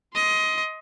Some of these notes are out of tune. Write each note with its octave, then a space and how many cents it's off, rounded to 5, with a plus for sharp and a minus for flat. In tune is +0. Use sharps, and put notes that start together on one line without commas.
D#5 +20 C6 +0